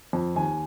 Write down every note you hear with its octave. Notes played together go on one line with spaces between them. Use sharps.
F2
D#2 G#5